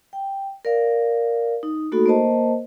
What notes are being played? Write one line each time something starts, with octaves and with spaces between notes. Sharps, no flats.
G5
A#4 D5 F5
D#4
A3 A#3 D#4 F#4 A4 B5
A#3 A#4 C5 D#5 A5